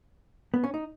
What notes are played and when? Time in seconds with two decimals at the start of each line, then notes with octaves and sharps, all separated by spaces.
0.54 B3
0.64 C#4
0.74 D#4